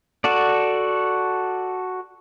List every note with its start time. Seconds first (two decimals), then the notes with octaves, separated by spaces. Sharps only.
0.24 F#4 A4 D5